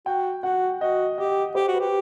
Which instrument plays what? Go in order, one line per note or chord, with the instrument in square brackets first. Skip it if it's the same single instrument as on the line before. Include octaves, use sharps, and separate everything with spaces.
[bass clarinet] F#4 [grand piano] G5
[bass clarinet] F#4 [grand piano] F#5
[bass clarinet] F#4 [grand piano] D#5
[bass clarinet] G4 [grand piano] D#5
[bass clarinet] G4 [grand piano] C5
[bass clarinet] F#4
[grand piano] B4
[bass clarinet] G4